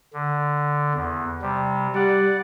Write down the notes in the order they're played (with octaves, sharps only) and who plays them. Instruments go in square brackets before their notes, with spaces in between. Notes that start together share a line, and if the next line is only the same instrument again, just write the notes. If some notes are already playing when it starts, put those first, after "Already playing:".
[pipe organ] D3
E2
C3 G3
[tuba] G3 [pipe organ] D5 F#5